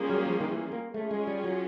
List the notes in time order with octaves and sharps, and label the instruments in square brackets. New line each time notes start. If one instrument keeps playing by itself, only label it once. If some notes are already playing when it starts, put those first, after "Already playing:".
Already playing: [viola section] G3 A#3 C#4 F4 G#4
[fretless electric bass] F#3
F3
D#3
E3
A#3
[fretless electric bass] A3 [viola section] C#4 F4 G#4
[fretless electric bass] G#3
G3
F#3